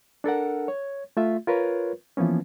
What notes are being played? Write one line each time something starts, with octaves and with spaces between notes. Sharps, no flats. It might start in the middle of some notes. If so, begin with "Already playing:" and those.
D4 A4 A#4 F#5
C#5
A3 F4 E5
F4 A#4 B4 C#5
E3 F3 A#3 B3 C#4